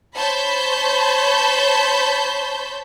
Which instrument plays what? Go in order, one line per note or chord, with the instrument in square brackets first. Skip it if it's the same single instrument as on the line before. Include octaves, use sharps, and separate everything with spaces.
[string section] C5 C#5 A5 B5 G6 B6